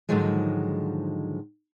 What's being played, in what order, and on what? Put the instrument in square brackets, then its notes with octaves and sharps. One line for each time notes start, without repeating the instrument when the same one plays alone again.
[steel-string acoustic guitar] G#2 D3 D#3 F3 F#3 G#3